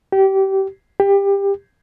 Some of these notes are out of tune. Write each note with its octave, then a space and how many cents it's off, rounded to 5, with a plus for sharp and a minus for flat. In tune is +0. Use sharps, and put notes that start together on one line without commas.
G4 -25
G4 +20